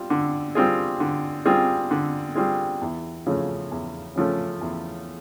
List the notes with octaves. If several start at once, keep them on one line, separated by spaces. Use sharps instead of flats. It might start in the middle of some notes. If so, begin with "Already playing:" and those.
Already playing: G3 C4 F4
D3
G3 C4 F4 G#4
D3
G3 C4 F4 G#4
D3
G3 C4 F4 G#4
E2
C#3 F3 A3 C#4
E2
C#3 F3 A3 C#4
E2